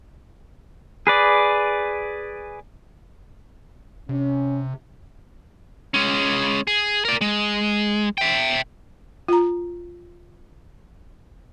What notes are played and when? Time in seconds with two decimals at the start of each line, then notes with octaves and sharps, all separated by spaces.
1.07 G#4 B4 D5
4.09 C3 C#4
5.94 G#3 C#4
6.67 G#4
7.05 A#4 D5
7.21 G#3
8.18 E5 G5
9.28 F4 A#5